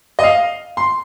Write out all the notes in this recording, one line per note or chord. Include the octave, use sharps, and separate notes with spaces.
D#5
F5
C6